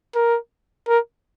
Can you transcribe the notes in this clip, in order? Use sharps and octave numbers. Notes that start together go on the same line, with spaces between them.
A#4
A#4